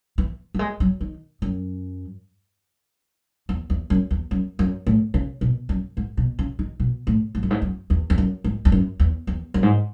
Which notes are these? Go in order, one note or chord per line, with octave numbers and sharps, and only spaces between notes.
E3
F#3
G#3
F#3
D#3
F#2
E2
E2
F#2
E2
F#2
F#2
A2
C#3
B2
F#2
G#2
B2
C#3
D#3
B2
A2
G#2
F#2
G#2
F#2
E2
E2
F#2
G#2
E2
F#2
E2
E2
F#2
G#2